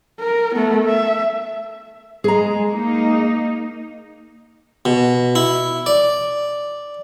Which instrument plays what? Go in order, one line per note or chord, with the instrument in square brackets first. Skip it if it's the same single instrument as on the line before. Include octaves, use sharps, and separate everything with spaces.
[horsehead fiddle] A#4
A3 B3
E5
[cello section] G#3 [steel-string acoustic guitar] G#4 A#5
[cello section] A#3 D#4
[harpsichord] B2
E4
D5